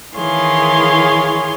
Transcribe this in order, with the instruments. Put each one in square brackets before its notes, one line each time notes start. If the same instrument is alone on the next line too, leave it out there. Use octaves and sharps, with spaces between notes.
[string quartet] D#3 E3 G#4 C#5 F5 C6